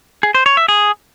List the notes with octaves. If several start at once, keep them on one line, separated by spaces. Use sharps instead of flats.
G#4
C5
C#5
E5
G#4